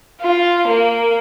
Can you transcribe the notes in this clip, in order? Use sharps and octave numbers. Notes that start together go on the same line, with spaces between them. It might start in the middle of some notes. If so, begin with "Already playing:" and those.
F4
A#3